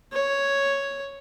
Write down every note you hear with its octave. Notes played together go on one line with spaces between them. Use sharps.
C#5